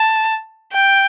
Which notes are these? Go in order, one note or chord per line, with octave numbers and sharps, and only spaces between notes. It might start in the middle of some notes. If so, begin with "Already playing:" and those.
Already playing: A5
G5